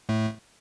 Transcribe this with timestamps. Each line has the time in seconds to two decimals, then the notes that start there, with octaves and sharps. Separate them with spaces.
0.09 A2 A3